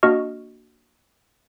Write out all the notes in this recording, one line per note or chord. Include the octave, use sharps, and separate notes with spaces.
A#3 D4 F#4 D#5 C#6 F6